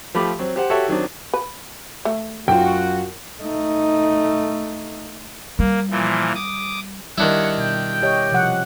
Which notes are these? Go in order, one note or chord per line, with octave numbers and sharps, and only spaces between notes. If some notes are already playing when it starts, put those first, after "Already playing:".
F3 A3 G4 B5 D6
F#3 C4
G4 C5 F#5
F#4 G4 A4 C#5 E5
D#3 F#3 C4 D4
B4
A3
F#2 F4 F#4 G5
A3 D#4
G3 A#3
A#2 E3 F3
D6 D#6
D#3 G3 D4 E4 C#5 F#5
B2 G5
G4 C#5 D#5
C3 F3 F#5